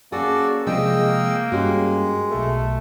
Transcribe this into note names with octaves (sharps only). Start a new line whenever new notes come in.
A#3 C#4 F#4 G#4 A4 D5
C3 F3 G#3 A#3 D5 D#5 G5 E6
G2 G#3 C#4 F#4 G4
B1 A3 A4